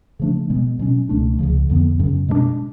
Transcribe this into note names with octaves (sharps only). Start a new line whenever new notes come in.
C#3 F3 A3 D4
B2 G#3 B3
B2 F#3 C#4
C#2 B2 A3 D4
C#2 C#3 F3
F2 D3 F3 B3
F#2 C#3 F#3 C#4
B2 G#3 B3 D4